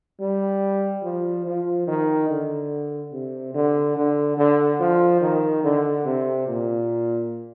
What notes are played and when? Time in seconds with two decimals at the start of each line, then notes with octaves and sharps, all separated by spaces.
0.20 G3
1.04 F3
1.46 F3
1.87 D#3
2.29 D3
3.13 C3
3.54 D3
3.97 D3
4.37 D3
4.80 F3
5.21 D#3
5.64 D3
6.06 C3
6.47 A#2